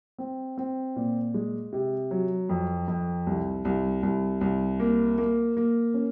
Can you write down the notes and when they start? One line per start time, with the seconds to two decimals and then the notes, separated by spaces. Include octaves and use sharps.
0.18 C4
0.58 C4
0.96 A#2
1.34 G#3
1.72 C3
2.11 F#3
2.49 F2
2.88 F2
3.27 C2
3.65 C2
4.03 C2
4.41 C2
4.80 A#3
5.18 A#3
5.57 A#3
5.94 C#4